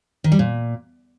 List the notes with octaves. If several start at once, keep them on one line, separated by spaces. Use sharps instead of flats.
D#3
G3
A#2